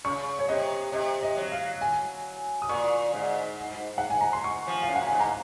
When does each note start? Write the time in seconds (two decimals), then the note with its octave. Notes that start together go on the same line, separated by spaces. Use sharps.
0.04 C#3 C#6
0.39 C#5
0.48 C3 D#5
0.92 C3 D#5
1.23 D#5
1.37 F#3
1.52 F5
1.81 G#5
2.62 D#6
2.69 A#2 C#6
3.13 G#2
3.98 F#5
4.10 G#5
4.21 A#5
4.33 C6
4.44 C#6
4.67 F3
4.82 F5
4.88 F#2
4.96 F#5
5.07 G#2 G#5
5.20 A#5